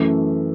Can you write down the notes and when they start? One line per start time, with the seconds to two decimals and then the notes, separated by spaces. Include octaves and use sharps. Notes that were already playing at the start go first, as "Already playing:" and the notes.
Already playing: F#2 E3 A3